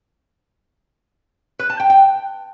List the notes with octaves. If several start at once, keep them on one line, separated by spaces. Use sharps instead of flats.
B4
A5
G5
G5